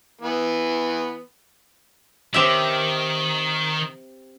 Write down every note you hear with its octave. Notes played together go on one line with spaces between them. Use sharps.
E3 B3
D#3 C4 G4 E5